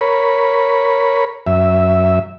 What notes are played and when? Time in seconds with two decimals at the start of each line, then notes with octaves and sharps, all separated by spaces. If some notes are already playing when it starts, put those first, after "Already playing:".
0.01 A#4 C#5 B5
1.47 F#2 E5